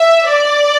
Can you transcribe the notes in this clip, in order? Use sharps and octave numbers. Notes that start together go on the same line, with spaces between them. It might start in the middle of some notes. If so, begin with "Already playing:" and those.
Already playing: E5
D5